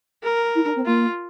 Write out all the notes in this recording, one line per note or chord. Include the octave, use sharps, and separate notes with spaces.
A#4
E4
D4
C4
A#3 F4